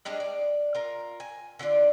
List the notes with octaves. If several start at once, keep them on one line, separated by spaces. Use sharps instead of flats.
G3 G#3 D4 D#5
D5
F4 A#4
G#5
D3 D4 F4 D5